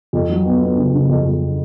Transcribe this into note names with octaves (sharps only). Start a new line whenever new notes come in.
F2
F#3
B3
B3
C#3
C#3
F2
F2